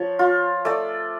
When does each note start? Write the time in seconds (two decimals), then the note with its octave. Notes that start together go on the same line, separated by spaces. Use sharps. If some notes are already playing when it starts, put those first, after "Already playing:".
Already playing: F3 C#5
0.19 F4
0.65 A3 D5